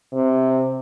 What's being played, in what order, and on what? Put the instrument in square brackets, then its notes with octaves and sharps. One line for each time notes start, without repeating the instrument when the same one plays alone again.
[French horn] C3